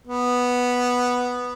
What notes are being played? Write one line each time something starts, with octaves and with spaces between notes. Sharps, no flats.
B3